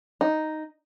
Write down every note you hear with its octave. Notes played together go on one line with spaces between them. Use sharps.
D#4